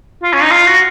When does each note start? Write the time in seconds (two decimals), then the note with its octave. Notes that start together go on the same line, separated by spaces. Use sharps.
0.23 F4
0.33 C#4
0.42 D#4
0.51 F4
0.66 F#4